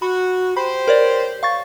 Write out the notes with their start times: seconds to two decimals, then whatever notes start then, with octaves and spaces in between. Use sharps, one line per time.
0.02 F#4 B5
0.57 G4 C5 B5
0.88 A#4 C#5 D5
1.43 F5 C#6 A6